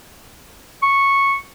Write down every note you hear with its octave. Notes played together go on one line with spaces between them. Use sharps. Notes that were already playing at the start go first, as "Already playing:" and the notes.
C#6